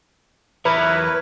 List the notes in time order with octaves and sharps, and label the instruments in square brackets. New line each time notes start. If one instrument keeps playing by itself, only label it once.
[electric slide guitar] E2 E5 A#5 [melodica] E4 A#4 C#5 [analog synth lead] B4